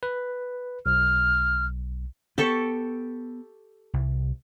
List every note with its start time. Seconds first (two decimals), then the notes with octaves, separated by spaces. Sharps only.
0.03 B4
0.86 B1 F6
2.38 B3 G4 A4 C#6
3.93 C2